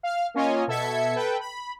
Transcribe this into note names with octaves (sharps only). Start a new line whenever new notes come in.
F5 F6
A#3 C#4 F4 C#5 D#5 G#5
B2 A4 E5 G#6 B6 C#7
A4 B4 G5
B5